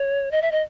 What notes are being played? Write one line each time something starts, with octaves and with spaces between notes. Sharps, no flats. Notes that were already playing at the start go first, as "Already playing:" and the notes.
Already playing: C#5
D#5
E5
D#5